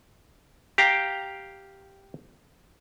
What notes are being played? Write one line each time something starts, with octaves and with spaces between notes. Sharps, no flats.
G4 F5 G5 A#5